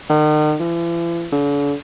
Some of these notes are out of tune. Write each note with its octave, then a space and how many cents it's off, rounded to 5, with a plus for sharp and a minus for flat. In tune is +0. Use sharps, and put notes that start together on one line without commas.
D#3 -40
E3 +45
D3 -40